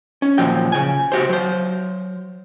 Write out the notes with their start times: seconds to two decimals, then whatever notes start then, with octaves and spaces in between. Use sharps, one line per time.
0.22 C#4
0.38 D#2 A#2 F3 F#3 G5
0.72 C#3 G#5
1.12 F#4 G4 C5
1.29 F#3 C5